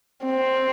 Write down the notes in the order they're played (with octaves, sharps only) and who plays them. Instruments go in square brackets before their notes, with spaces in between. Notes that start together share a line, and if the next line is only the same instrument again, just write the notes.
[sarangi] C4